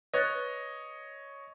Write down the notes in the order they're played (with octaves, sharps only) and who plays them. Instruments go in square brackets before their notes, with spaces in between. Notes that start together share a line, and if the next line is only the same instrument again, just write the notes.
[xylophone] B4 F#6 A6 [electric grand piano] C#5 D#5